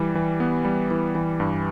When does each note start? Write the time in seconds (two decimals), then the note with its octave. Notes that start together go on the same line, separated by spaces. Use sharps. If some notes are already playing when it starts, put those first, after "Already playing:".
Already playing: E3 G3
0.15 E3
0.40 B3
0.65 G3
0.91 E3
1.15 E3
1.40 G2